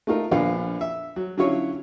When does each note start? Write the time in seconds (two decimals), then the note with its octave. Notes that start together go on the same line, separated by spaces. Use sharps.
0.07 A3 D#4 F4 A#4
0.31 A#1 B3 D4 F4 F5
0.81 E5
1.16 F#3
1.37 D3 F#3 C#4 E4 F4 C#5